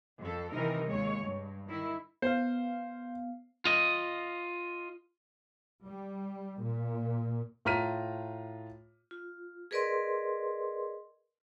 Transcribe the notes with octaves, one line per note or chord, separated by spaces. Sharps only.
F2 A4
C3 D#3 E3 D#4 A#4
D#2 G#3 C#5
G2
D#3 E4
B3 C5 F5
F4 D#5
G3
A#2
A2 F4 A#5 F6 B6 D#7
F4
G#4 A#4 B4 D5 D#5 C6